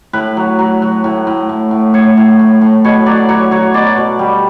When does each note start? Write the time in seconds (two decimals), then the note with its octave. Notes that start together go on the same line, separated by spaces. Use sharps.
0.13 A2 B4
0.37 F#3
0.59 F#3
0.82 F#3
1.04 A2
1.27 A2
1.49 A2
1.71 A2
1.94 A2 C#5
2.17 A2
2.39 A2
2.61 A2
2.85 B2 C#5
3.06 F#3 D5
3.29 F#3 C#5
3.51 F#3 C#5
3.74 B2 D5
3.97 B2
4.19 G3